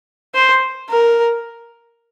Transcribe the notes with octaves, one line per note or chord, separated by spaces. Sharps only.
C5
A#4